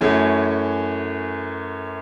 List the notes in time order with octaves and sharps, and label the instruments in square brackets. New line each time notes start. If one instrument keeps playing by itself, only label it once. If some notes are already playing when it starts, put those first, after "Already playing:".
[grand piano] F#2 E3 A3 C#4 F#4